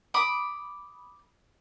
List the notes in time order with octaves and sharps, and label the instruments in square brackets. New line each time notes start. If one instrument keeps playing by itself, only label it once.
[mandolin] B5 D6 D#6